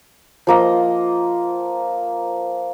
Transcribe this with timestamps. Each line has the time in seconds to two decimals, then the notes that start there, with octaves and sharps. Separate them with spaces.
0.47 F3 A#3 D#5